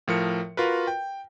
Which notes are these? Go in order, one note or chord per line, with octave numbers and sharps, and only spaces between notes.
A2 F3 A#4 C#7
F4 F#4 A#4 B4
G5